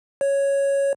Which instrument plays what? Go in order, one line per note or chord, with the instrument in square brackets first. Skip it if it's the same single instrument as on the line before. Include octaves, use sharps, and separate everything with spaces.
[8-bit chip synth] C#5